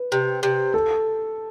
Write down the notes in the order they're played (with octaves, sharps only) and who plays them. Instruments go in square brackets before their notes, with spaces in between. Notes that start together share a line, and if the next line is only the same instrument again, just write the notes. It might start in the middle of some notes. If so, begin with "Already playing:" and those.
Already playing: [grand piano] B4
[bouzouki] C3
C3
[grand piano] A4